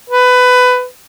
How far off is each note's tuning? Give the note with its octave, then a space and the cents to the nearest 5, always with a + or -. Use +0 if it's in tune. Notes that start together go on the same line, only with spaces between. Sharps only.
B4 +15